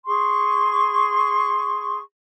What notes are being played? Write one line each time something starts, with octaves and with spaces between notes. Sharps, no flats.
G#4 C6 C#6